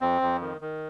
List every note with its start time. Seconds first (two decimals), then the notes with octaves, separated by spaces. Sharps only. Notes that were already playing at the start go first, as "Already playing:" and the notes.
0.01 F2 C4
0.22 F2
0.41 D#3
0.61 D#3